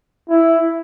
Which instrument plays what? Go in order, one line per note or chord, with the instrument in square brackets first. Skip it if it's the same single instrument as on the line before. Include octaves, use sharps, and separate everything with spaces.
[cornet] E4